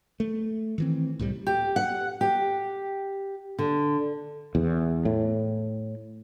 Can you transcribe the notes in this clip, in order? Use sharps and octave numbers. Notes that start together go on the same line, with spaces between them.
A3
D#3 E3 C4
C2 A2 C3 G3
G4
F#5
G4
D3
E2
A2